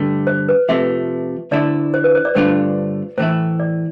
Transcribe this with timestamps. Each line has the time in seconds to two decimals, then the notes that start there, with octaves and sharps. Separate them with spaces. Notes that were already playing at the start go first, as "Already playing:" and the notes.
Already playing: G2 D3 A3
0.27 C5
0.49 B4
0.69 F2 C3 F3 A3 E5
1.51 D2 D3 A3 E4 D5
1.94 C5
2.04 B4
2.15 C5
2.25 D5
2.35 G2 D3 A3 D4 F4 C5
3.18 A2 E3 A3 E4 C5
3.60 D5